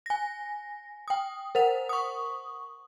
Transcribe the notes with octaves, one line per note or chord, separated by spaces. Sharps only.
G#5 A#6
G5 D#6
A#4 C5 F#5 F7
C#6 D#6